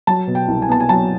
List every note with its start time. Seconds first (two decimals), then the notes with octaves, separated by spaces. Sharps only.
0.07 F#3 A5
0.27 B2
0.35 G5
0.48 C2
0.62 G#5
0.69 B3 A5
0.80 G#5
0.89 F#3 A5